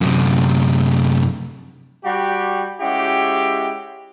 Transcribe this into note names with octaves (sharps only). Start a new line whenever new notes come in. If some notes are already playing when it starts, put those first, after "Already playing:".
F#2 C3
G3 F#4 G4
G#3 C#4 E4 F#4 G4